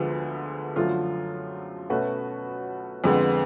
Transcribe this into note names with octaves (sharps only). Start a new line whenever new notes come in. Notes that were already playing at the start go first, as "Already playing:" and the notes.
Already playing: D2 D3 F3 G#3 B3
F#2 D3 F3 A3 F4
B2 A3 C#4 F#4 B4
F2 D3 G#3 B3